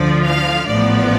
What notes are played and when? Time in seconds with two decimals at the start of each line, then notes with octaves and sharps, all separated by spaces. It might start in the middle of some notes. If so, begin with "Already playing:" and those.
Already playing: D2 D3 F3 D5
0.23 F5
0.67 A1 A2 F3 B3 D5